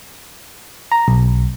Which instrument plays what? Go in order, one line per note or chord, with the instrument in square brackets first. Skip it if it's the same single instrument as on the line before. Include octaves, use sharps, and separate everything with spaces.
[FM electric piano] A#5
B1